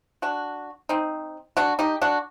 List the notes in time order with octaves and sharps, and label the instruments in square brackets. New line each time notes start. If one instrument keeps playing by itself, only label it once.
[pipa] D4 F#4
C4 D#4
D4 F#4
D#4 G4
D4 F#4